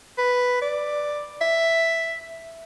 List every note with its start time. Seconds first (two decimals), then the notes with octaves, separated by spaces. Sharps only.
0.18 B4
0.62 D5
1.41 E5